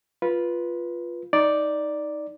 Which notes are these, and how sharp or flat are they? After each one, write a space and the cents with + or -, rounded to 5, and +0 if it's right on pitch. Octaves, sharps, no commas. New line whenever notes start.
F4 +0 B4 -15
D#4 +10 D5 +0